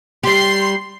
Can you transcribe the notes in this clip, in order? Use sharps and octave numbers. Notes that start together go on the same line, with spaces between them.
G3 G4 C6 C7